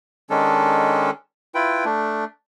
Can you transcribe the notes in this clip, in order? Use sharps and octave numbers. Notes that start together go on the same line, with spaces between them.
D#3 G#3 C#4 D4 A4
E4 F4 B4 G5
A3 D4